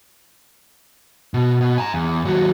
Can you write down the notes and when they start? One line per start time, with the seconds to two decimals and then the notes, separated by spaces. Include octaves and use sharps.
1.34 B2
1.61 B2
1.78 G#5 A#5
1.94 E2
2.25 D#2 F#3